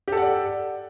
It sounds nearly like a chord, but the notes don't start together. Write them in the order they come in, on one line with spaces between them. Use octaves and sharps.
G4 A4 F#5 D5